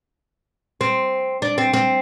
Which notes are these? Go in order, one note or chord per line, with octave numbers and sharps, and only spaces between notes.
C4
D4
C4
C4